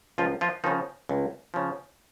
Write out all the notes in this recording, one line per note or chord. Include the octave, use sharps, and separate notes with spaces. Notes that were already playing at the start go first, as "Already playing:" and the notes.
C#2 F3 F4
F3 F4
C#3 D#3 F3 D#4
C#2
C#3 F3